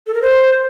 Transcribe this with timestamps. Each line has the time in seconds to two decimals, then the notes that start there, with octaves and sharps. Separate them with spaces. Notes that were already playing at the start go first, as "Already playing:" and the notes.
0.07 A4
0.14 A#4
0.22 C5